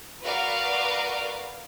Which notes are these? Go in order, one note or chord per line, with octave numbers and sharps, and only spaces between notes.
F#4 A#4 B4 D5 F5